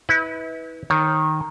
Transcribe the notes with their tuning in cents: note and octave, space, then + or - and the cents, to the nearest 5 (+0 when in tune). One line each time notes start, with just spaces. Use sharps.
E4 -35 B4 +0
D#3 +0 C#5 -30